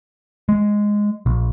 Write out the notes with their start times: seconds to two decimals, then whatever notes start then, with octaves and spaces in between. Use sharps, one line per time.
0.49 G#3
1.26 A#1